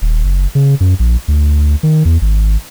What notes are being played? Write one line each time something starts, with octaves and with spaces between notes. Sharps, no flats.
D#1
F#1
C#3
F#2
A#1
D2
D#3
E2
G#1